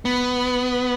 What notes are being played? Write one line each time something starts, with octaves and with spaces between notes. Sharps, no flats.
B3